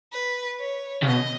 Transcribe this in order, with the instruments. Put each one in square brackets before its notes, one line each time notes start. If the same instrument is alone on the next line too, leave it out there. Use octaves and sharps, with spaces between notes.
[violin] B4
C#5
[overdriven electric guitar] C#3
[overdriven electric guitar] B2 [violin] D#5